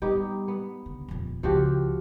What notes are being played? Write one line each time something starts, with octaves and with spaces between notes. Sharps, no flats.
G3 B3 D#4 G4
B3
D3
D#1 F2
C#2 F3 F#4 G4